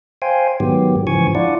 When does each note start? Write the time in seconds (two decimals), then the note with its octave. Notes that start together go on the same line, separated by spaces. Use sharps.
0.22 C5 F5 G5 G#5
0.60 G#2 D#3 F#3 B3 G4
1.07 G#2 C#3 E3 F3 G#5 C#6
1.35 D4 E4 F4 D5 F#5